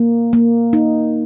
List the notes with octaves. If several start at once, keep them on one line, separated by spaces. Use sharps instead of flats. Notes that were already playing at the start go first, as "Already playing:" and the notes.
Already playing: A#3
A#3
D#4